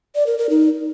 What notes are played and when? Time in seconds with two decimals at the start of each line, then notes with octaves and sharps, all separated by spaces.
0.15 D5
0.27 A#4
0.38 A#4
0.50 D#4